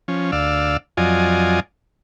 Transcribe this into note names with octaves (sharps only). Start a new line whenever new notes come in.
F3 C#4
D2 D5 F5 E6
F2 F#3 F4 D5 D#5 G#5